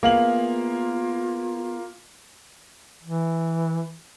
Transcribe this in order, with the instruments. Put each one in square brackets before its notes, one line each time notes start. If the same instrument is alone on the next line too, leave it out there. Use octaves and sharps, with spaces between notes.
[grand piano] A#3 F5 F#7 [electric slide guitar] B3 G#4 [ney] F4
[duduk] E3